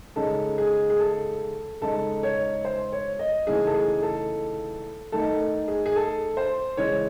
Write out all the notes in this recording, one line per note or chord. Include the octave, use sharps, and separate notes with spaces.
C#3 G#3 D#4 A4
G#4
G#4
A4
C#3 G#3 D#4 A4
C#5
C5
C#5
D#5
C#3 E3 A3 D#4 G#4
A4
G#4
A4
D#3 A3 D#4 A4
G#4
G#4
A4
C5
C#3 E3 G#3 C#5